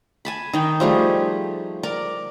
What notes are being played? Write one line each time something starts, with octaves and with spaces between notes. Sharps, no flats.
G#5 A5 B5
D#3 D#4 G5
F3 G3 A3 G#4
A#4 D5